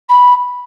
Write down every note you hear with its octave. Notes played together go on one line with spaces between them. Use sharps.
B5